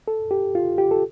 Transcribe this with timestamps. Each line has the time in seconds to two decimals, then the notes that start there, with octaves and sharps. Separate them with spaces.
0.08 A4
0.31 G4
0.55 F4
0.78 G4
0.91 A4